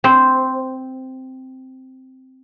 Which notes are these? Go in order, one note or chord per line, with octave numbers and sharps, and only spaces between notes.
C4 C5